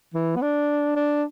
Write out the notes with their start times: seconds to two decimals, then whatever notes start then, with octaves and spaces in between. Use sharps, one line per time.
0.14 E3
0.36 B3
0.42 D4
0.95 D4